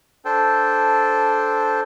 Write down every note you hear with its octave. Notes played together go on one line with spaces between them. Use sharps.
D4 A4 C5 G5